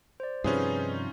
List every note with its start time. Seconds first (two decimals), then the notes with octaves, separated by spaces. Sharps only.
0.20 C5 D5
0.44 G2 C3 F3 C#4 D#4 F4 G#4 B4